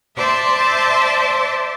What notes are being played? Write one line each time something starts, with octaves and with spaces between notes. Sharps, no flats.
C5 D5 E5 A5 C6